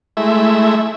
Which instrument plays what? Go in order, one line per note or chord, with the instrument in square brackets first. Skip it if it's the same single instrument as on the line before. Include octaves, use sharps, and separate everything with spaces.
[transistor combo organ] G#3 A3 E4 E5